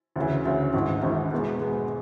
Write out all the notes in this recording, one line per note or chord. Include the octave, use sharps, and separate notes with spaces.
D2 C#3 E3
D2 C#3 E3
G#1 G#2 E3
G#1 G#2 E3
E2 B2 G#3 B3
E2 B2 G#3 B3